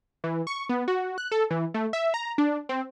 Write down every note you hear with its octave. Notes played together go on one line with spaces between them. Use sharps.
E3
C#6
B3
F#4
F#6
A4
E3
A3
E5
A#5
D4
C4